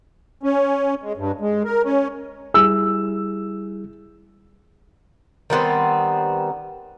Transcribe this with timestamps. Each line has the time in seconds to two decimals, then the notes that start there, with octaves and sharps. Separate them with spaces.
0.43 C#4
1.03 G#3
1.17 G2
1.41 G#3
1.64 A#4
1.84 C#4
2.54 G3 E4 G#4 E6
5.50 D#3 G3 B3 C4